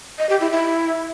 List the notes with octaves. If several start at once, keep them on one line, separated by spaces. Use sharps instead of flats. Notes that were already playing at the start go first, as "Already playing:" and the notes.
D#5
G4
E4
E4